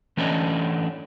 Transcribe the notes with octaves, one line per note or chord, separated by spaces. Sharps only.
E3 A3 C#4 D4 C#5 D#5